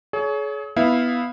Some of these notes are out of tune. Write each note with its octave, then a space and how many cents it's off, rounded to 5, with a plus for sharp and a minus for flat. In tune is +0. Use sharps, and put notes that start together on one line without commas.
G#4 +40 C#5 +20
B3 +0 E4 -10 F5 +0